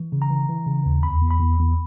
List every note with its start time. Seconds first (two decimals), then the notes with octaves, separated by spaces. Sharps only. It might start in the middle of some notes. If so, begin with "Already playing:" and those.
Already playing: E3
0.12 C#3
0.22 A#5
0.30 E3
0.49 E3
0.67 C#3
0.86 D#2
1.03 E2 B5
1.21 E2
1.31 B5
1.40 E2
1.59 E2